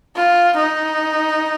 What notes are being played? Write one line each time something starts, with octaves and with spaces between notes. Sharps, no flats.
F4
D#4